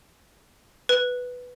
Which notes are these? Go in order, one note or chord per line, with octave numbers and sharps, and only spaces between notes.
B4